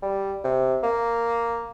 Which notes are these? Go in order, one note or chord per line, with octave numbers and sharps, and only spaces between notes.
G3
C3
A#3